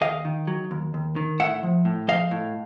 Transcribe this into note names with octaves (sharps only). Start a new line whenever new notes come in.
D#2 D#5 F5
D#3
F#3
D#2
D#2
D#3
A2 E5 F#5
F3
A2
F3 D#5 F5
A2